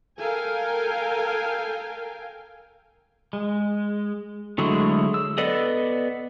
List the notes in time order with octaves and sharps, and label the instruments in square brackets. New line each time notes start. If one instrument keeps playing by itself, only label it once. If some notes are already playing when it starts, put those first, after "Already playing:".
[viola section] A4 A#4 F5 G5 G#5
[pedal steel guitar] G#3
D3 F#3 G#3 A3 E4
E6
B3 A4 B4 D5 D#5